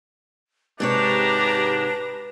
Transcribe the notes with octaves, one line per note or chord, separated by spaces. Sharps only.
G#2 C3 G#3 D4 G4 B4 C#5 A#5